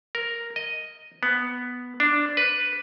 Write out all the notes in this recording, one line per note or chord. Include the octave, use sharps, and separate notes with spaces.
A#4
D#5
B3
D4
B4